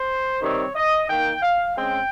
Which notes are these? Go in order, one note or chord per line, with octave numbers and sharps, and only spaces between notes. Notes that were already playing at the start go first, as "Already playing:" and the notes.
Already playing: C5
C3 D#3 G3 C4 C#5
D#5
D#3 A#3 G5
F5
C#3 G#3 C4 G5